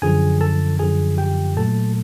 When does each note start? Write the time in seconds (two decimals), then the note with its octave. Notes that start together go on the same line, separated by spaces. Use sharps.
0.02 F#2 D3 F3 G#4 G#5
0.41 A4 A5
0.79 F#2 D3 F3 G#4 G#5
1.18 G4 G5
1.56 A#2 F#3 A3 A4 A5